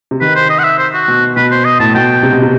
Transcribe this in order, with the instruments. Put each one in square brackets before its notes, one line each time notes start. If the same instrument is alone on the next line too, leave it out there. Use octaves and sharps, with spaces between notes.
[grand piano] C3
[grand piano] D#3 [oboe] B4
[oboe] C5
D#5
F#5
E5
C5
F#4
[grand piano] B2
[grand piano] B2 [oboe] B4
[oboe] C5
D#5
[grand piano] A2 [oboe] A5
[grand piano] B2 [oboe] G5
[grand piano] C3
B2
C3